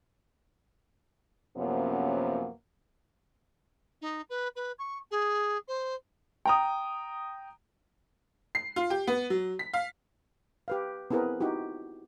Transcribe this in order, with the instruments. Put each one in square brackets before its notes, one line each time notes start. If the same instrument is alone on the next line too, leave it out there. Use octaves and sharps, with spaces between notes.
[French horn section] F#2 C3 F3 A#3 B3 C#4
[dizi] D#4
B4
B4
C#6
G#4
C5
[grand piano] G5 A#5 D#6
[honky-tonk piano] C7
F4
G4
B3
F#3
B6
F5
[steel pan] G4 B4 F5
B3 C4 E4 G#4 A#4 B4
D#4 E4 F#4 G4